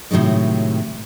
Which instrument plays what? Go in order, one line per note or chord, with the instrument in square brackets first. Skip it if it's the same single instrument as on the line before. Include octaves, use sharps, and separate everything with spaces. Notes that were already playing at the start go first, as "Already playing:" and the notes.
[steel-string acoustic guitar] A2 C3 D#3 F#3 G#3